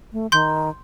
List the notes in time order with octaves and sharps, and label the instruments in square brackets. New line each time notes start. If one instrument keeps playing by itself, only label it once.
[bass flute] A3
[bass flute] D#3 [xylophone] C6 G6